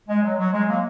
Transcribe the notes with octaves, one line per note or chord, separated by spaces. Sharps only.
G#3
F#3
F#3
G#3
F#3 A#3